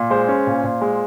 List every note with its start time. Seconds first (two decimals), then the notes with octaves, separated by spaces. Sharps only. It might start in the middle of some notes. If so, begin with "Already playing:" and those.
Already playing: A#2
0.10 G#3 C5
0.28 C#4
0.47 A#2
0.64 A#2
0.81 G#3